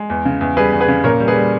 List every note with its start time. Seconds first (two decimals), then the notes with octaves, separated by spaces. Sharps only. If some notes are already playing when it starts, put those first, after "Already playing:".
Already playing: G#3
0.10 E2
0.25 C#3
0.41 E2
0.57 G3 G#4 B4
0.73 E2
0.80 G#4 B4
0.88 C#3
1.04 A#2 A#4 C#5
1.20 G3
1.28 G#4 B4
1.36 G3